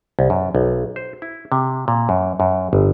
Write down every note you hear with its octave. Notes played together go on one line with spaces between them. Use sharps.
C2
F#2
B1
C5
E4
C3
A#2
F#2
F#2
G1